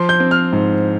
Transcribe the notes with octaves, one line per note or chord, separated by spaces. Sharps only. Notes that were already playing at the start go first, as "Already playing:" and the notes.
Already playing: F3 C6
G6
C4
F6
G#2